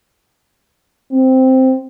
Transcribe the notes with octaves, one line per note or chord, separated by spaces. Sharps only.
C4